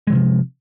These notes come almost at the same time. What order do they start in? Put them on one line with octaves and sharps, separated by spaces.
G#3 E3 C3 F3